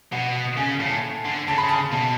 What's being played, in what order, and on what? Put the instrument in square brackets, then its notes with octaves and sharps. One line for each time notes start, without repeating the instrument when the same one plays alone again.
[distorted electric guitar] B2 [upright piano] F#5
[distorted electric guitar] C#3 [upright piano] G#5
[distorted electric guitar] A2
[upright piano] A5
[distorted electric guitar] D3
[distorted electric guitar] C#3 [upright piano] A5
[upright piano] B5
A5
[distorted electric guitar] B2